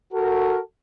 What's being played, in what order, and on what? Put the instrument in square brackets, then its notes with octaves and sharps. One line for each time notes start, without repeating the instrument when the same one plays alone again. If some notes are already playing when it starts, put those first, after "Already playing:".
[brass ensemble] F#4 A4 A#4